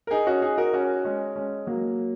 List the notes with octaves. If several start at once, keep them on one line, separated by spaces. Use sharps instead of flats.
A#4
D#4 G#4
C#4 F#4
D#4 G#4
F#4 A#4
C#4 F#4
G#3 C#4
G#3 C#4
F#3 A#3